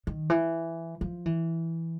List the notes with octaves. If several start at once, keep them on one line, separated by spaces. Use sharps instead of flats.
D#3
E3
F3
E3